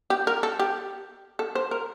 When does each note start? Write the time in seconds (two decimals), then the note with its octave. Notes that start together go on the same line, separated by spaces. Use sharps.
0.10 G4
0.27 A#4
0.43 A4
0.59 G4
1.39 A4
1.55 C5
1.71 A#4